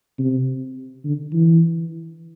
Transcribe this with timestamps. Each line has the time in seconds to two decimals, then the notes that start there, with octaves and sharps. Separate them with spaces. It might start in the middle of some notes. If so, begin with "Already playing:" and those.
0.19 C3
1.05 D3
1.33 E3